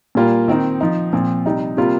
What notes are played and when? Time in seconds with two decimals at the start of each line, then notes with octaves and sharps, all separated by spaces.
0.15 A#2 G3 A#3 F4
0.48 D#3 C4 D#4
0.81 F3 D#4
1.13 A#2 F3 C4
1.46 C3 G3 D#4
1.77 C3 G3 A#3 F4